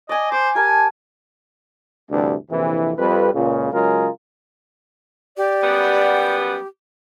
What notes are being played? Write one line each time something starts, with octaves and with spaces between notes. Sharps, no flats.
D5 D#5 G#5
C5 D6
G4 A#4 G#5 A5
D2 G2 C3 E3 D4
A#1 F2 C3 E3
F2 G3 B4
C#2 A#2 C#3
C#3 F#3 G#3 F4 G#4 A#4
G4 D5
F#2 G3 B3